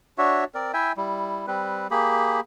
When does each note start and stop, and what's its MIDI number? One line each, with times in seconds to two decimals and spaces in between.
0.18 0.44 62
0.18 0.44 66
0.18 0.44 73
0.18 0.44 76
0.55 0.72 60
0.55 0.72 70
0.55 0.72 74
0.73 0.92 64
0.73 0.92 76
0.73 0.92 79
0.73 0.92 80
0.97 1.46 55
0.97 1.46 64
1.47 1.87 55
1.47 1.87 60
1.47 1.87 71
1.91 2.40 58
1.91 2.40 67
1.91 2.40 68
1.91 2.40 83